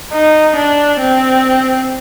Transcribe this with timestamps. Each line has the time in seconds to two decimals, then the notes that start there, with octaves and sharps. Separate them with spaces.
0.13 D#4
0.56 D4
1.01 C4